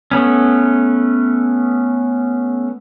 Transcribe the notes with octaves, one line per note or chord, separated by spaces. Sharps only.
A3 B3 C#4